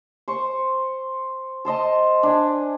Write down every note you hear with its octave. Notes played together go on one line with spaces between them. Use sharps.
C5 C#6
A4 C5 D#5 A5
D4 G#4